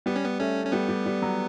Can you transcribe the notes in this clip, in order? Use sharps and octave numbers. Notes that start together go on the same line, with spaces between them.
G3 B3
C#4
B3
A3 C#4
C#4
G3 B3
G3
G3
F#3